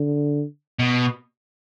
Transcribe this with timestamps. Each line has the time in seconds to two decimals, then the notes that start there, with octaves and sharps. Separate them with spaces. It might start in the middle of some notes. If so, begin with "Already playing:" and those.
Already playing: D3
0.79 B2